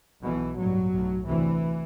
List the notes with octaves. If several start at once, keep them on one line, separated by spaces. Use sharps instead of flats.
B1 B2 E3
A1 G2 F#3
B1 A2
D2 C3 E3